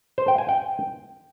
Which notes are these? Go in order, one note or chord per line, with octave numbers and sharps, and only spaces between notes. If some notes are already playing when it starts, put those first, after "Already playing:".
C5
G5
G#5
G5